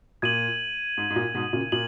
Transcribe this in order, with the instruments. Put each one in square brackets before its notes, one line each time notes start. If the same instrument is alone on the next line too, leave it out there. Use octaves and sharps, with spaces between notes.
[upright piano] A#2 [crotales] G#6 D#7 F#7
[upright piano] G#2
G#2
A#2
G#2 B2
A#2 C#3
[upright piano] A#2 [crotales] F#7